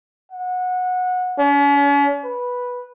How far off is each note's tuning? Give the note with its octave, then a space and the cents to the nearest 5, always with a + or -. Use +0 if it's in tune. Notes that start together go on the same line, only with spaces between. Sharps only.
F#5 -20
C#4 +40
B4 -10